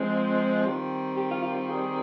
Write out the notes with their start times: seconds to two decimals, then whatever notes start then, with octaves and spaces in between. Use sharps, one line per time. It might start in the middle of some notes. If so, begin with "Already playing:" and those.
Already playing: F3 G#3 C4
0.14 F4
0.66 D#3 G3 C4
1.17 G4
1.30 F4
1.42 F4
1.55 F4
1.68 G#4